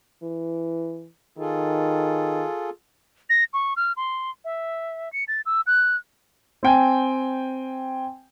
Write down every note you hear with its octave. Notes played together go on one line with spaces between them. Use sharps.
E3
D#3 F4 G#4 A4
A#6
C#6
F6
C6
E5
C#7
A6
E6
F#6
C4 G5 G#5